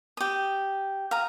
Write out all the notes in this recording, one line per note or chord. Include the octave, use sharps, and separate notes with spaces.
G4 D#6
F5 A#5 D#6